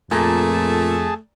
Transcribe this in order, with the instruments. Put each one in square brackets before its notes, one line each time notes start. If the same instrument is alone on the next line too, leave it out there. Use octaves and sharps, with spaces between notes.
[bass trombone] F2 [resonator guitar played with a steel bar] A#2 [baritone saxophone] A3 [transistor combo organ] G#4 A5